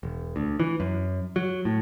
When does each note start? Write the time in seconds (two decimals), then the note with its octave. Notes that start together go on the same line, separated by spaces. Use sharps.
0.03 E1
0.36 D2
0.60 E3
0.80 F#2
1.36 F#3
1.65 A2